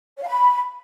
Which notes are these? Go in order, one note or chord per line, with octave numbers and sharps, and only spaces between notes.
C#5
F5
B5